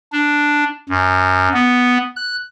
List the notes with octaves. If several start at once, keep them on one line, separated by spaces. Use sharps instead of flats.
D4
F#2
B3
F#6